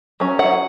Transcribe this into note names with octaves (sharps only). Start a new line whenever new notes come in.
F#3 C#4
F#5